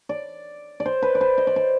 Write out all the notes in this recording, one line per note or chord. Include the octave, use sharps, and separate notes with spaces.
D5
D5
C5
B4
D5
C5
D#5
D5
C5